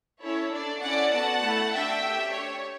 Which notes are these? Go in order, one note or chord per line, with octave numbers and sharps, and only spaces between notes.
C#4 E4 A4 C#5
D4 A4 D5
C#4 E4 A4 D5 F#5
B3 F#4 A4 F#5 A5
A3 E4 A4
D4 F#4 A4 E5 G5
A3 C#4 G4
D4 G4 C#5